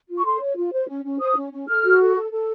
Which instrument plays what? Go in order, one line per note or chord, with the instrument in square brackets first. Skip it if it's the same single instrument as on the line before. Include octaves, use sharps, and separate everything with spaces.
[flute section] F4
C#6
A4 C6
C#5
F4
C5
C#4
C#4
C5 D#6
C#4
C#4
A4 F6
F#4
A4
A4
A4